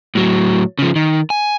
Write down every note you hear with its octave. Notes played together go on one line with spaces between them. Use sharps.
A2 F#3
C#3 F3
D#3
G#5